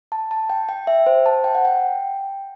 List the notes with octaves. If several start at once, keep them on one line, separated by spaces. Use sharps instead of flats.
A5
A5
G5
G5
E5
C5
A5
G5
F#5
G5